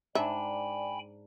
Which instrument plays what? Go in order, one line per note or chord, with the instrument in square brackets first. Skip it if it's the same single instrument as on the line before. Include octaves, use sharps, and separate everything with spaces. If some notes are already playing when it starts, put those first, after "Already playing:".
[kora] G#2 D4 [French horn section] D5 [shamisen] E5 [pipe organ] G5 G#5 B5